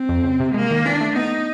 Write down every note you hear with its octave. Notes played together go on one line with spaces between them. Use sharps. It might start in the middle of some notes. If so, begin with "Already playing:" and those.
Already playing: C4
F2
C#2
C3
G#3 A#3
D#3
E3 D4
A3
B3 D#4